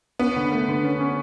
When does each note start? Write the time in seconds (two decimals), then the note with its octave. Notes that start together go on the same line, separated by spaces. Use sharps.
0.19 B3 C#4
0.36 D3
0.51 A3
0.68 D3
0.84 C#4
1.00 C#4